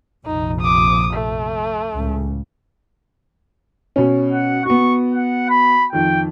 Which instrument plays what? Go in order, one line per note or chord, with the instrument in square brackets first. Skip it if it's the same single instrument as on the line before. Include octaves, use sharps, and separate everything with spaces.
[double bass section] A#1 F2 C3 [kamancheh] D#4
[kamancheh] D6 D#6
A3
[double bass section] C#2 A2 C#3
[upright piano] B2 C#4
[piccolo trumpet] F#5
[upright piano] B3 F#4 [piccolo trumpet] C#6
[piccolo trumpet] F#5
B5
[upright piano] F2 D#3 [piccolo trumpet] G5